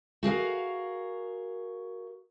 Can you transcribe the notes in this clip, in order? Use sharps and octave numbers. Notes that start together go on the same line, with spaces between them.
F#4 G#4 A#4 F5